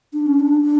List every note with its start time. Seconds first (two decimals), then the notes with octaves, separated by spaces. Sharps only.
0.13 D4
0.26 C#4
0.40 D4
0.61 D4